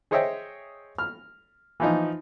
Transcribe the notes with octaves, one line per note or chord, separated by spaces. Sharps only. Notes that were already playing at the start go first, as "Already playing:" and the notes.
G#4 C5 C#5 D#5 E5 G5
F6
E3 F3 D#4